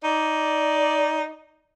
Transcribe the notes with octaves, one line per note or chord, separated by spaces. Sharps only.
D#4 D5